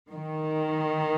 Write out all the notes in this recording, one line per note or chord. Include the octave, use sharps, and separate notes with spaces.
D#3